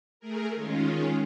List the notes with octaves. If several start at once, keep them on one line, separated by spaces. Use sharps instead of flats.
A3 G#4 A#4
D#3 G#3 C#4 F4